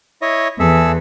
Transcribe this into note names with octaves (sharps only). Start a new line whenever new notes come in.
E4 C#5 D#5
E2 G#4 A4 E5